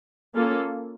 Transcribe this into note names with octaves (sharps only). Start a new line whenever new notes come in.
A#3 C#4 F4 A4